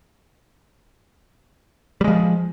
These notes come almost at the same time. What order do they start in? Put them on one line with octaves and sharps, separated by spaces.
G3 G#3 F3